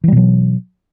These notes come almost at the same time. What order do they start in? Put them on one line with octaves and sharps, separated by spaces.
E3 G3 B2 F#3